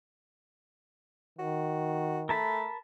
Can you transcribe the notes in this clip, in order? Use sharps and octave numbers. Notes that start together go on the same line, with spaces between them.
D#3 F#4
A3 A#4 A5 B5